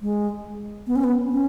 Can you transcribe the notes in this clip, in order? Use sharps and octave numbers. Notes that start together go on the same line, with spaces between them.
G#3
B3
C#4
B3
C#4